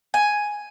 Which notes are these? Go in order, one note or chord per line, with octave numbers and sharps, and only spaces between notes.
G#5